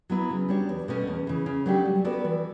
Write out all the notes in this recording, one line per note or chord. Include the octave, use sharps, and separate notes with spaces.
F#3 B3 E4 B4
C#3
G3 D4 F#4 C#5
E2
B2 A3 C#4
E2
C#3 E3
C#3
F#3 A3 D4 G4
G3
B3 F#4 A4 D5
E3